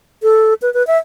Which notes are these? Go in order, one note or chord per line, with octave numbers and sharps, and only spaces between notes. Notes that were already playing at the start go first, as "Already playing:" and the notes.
A4
B4
B4
E5